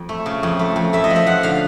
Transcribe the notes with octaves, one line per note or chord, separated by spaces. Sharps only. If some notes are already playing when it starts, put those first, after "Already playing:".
Already playing: F2
A3
C#3
F2
A3
F2
A3 E5
D#5
F3
E5
F3 F#5
D3 F5